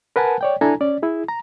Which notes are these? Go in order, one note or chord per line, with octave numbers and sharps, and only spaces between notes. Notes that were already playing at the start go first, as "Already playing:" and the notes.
A#4 B4 F#5 G#5 A5
C#5 D5 G5
D4 E4 A4 G#5 A#5
C#4 D5
E4 G#4
A#5